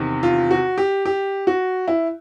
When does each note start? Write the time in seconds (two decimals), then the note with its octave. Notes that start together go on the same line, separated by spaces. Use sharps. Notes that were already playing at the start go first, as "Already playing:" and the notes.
Already playing: E2 C3 D#3
0.23 F4
0.51 F#4
0.78 G4
1.05 G4
1.47 F#4
1.88 E4